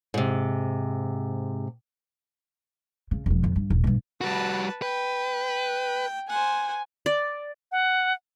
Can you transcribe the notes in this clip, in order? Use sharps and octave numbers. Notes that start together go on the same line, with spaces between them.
G#2 C3
C#3
E1 F3
F2 C3
G2
D#1
G2 B2
G3 F#4 B4 A5
B4 G5
C5 F#5 G#5
D5
F#5